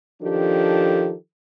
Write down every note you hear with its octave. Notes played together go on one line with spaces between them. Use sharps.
D#3 F3 D4 G4 A4